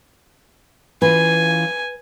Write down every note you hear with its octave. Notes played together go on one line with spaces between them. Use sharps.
E3 C#4 F4 B4 G#5